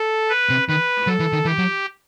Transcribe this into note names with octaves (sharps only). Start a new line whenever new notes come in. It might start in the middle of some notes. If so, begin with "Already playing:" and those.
Already playing: A4
B4
C3
D#3 B4
F#3 A4
E3
D#3
E3 G4
F#3